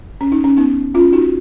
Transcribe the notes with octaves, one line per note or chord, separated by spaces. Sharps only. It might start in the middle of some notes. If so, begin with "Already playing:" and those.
C#4
D#4
C#4
B3 D#4
C#4 F4
D#4 F#4